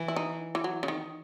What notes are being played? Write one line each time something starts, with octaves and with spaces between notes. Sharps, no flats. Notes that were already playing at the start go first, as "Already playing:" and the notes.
Already playing: E3
E4
D#4
E3
F#3
C#3
D#3